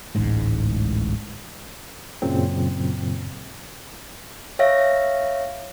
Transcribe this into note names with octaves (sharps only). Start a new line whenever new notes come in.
D1 A1 G#2 G#3
F#2 A#2 C#3 F#3 C4
C#5 E5 F5 A#6